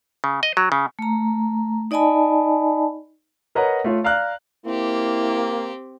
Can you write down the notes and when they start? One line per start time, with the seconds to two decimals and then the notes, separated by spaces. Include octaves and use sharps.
0.24 C#3
0.43 D#5
0.57 F#3
0.72 C#3
0.99 A3 A#5
1.91 D#4 D5 D#5 G#5 A5 B5
3.55 A#4 B4 C#5 D#5 F#5 A#5
3.84 A3 F4 C#5
4.04 D5 F5 A#5 F6 F#6
4.66 A#3 C4 E4 G4